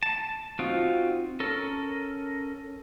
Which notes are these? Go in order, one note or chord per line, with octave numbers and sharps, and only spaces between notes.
A5
C4 D#4 F4 F#4
C#4 A4 A#4